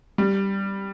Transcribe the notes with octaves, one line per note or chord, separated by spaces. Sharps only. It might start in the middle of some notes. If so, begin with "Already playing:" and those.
G3